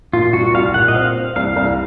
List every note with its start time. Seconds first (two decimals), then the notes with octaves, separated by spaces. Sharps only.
0.13 A#2 F4
0.33 C2 F#4
0.54 C2 F5
0.74 A#2 F#5
0.88 D#5
0.94 C4 F5
1.15 C4
1.36 C2 F5
1.56 C2